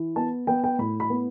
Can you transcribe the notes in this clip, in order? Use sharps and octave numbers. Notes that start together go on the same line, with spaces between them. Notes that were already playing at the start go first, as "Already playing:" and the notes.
Already playing: E3
B3 A5
B3 G5
G5
A2 B5
B5
B3